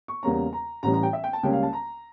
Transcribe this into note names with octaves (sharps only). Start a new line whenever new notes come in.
C#6
E2 C#3 G3 A#3 C#4 A#5
A#5
A1 A2 E3 G3 C#4 A#5
A#5
G5
E5
G5
A5
C#2 C#3 G3 A#3 C#4 G5
F5
A5
A#5